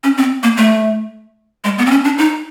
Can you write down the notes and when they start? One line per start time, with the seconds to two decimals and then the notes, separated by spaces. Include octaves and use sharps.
0.04 C#4
0.18 C4
0.43 A#3
0.57 A3
1.64 G#3
1.78 B3
1.86 C4
1.91 C#4
2.04 D4
2.18 D#4